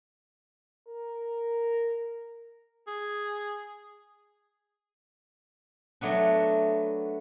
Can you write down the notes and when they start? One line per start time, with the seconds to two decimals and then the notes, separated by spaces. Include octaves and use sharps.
0.88 A#4
2.87 G#4
6.01 F#3 A3 B3 D4